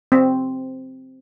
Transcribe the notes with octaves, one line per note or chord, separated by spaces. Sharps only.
C4